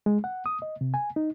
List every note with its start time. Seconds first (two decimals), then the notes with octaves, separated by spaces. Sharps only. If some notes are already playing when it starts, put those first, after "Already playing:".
0.06 G#3
0.24 F#5
0.46 D#6
0.62 D#5
0.81 C3
0.94 G#5
1.16 D#4